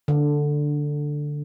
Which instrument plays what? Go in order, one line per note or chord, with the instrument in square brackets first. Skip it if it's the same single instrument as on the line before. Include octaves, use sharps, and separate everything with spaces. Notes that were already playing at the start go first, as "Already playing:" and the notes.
[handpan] D3